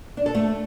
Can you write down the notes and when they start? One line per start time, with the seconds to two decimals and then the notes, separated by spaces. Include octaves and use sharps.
0.17 D4
0.26 A4
0.35 A3